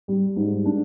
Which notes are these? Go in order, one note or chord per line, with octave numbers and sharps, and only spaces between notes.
G3
G#2
D4